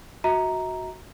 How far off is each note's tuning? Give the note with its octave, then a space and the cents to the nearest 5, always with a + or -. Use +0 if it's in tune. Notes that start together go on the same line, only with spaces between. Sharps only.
F#4 +0 E5 -45 A#5 +0